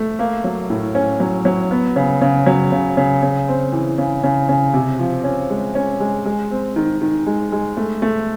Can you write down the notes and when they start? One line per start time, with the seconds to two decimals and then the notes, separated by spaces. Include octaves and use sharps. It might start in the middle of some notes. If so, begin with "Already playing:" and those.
Already playing: A3
0.19 A#3
0.44 F#3
0.70 A2
0.95 C#4
1.20 F#3
1.45 F#3
1.71 B3
1.96 C#3
2.22 C#3
2.46 F#3
2.72 C#3
2.97 C#3
3.22 C#3
3.48 C4
3.73 E3
3.98 C#3
4.24 C#3
4.49 C#3
4.74 C3
4.99 F3
5.24 C#4
5.50 G#3
5.75 C#4
6.00 G#3
6.25 G#3
6.51 C4
6.76 D#3
7.02 D#3
7.26 G#3
7.52 G#3
7.77 A3
8.02 A3